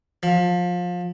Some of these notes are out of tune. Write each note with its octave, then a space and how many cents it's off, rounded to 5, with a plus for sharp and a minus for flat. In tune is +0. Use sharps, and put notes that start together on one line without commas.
F3 +25